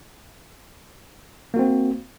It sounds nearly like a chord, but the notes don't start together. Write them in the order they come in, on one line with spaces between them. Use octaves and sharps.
A#3 F#4 C4